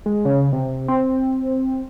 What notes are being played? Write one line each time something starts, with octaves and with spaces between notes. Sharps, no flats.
G#3
C#3
C3
C4